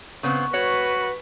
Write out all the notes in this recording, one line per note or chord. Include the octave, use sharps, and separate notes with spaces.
C#3 B3 C4 C#6
F#4 B4 C#5